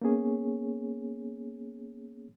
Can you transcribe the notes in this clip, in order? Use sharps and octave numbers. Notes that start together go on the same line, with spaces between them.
A#3 B3 C#4 G#4 C#5